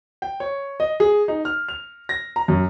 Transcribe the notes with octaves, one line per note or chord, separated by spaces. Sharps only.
G5
C#5
D#5
G#4
D#4
F6
F7
A#6
A#5
F#2